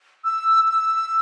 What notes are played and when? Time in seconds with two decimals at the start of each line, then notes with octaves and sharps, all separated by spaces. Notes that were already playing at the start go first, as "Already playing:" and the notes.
0.24 E6
0.65 E6